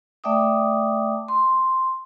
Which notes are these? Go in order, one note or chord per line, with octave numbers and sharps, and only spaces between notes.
A3 D5 E5 G5 D6 D#6
C6